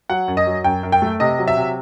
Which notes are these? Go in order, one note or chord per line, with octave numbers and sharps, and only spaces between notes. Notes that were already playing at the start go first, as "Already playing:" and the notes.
F#3 F#5
F#2
D#5
F#3
F#2 G5
F#2
G5
A3
C3 D#5
F#3
E5
C3